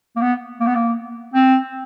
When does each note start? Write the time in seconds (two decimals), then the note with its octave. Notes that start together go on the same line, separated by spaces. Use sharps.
0.16 A#3
0.22 B3
0.60 A#3
0.67 B3
0.75 A#3
1.34 C4